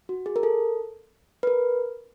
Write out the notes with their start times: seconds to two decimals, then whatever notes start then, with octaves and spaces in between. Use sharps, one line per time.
0.09 F#4
0.26 G#4
0.36 A#4
0.43 A4
1.43 B4
1.47 A#4